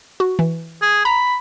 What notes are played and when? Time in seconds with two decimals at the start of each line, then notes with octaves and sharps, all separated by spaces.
0.20 F#4
0.39 E3
0.82 G#4
1.05 A#5 B5